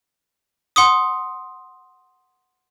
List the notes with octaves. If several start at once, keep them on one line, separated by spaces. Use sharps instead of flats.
F#5 C6 D6 D#6